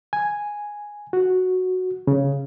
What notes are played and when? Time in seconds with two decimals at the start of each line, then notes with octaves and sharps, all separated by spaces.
0.13 G#5
1.13 F#4
2.07 C#3